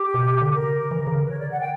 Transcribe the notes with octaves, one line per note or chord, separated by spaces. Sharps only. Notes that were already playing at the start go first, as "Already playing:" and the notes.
Already playing: G4
B2
D3
C#3 A#4
E3
D3
C#3
D3
B4
C#5
D5
F#5
G5